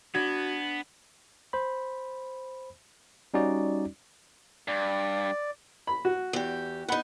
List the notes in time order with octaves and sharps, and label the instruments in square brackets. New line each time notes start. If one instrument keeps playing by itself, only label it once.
[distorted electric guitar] B3 [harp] D4 [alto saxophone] F#4 [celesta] G#6
[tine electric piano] C5 B5
G3 C#4 D#4 F#4 D5
[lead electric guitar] G2 [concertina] D5
[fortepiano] B5
F#4
[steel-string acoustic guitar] E2 G4
[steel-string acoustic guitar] B3 D#4 [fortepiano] F#5 B5